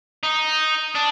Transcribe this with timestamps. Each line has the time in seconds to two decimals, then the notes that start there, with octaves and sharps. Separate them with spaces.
0.23 D#4
0.95 D4